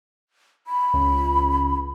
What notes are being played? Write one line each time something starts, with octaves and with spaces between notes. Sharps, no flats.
B5
C#2